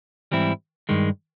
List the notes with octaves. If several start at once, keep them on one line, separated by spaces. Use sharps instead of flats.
G#2 E3 G3 C4 E4
G2 D#3 G#3